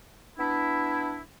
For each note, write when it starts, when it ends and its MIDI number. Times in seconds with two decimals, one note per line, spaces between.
0.38 1.19 59
0.38 1.19 62
0.38 1.19 64